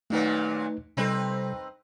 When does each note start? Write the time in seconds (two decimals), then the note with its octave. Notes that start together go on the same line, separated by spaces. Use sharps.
0.10 D#2 A#2 F#3 A3 D#4 B4
0.97 C3 G3 C4 D#4 A4 B4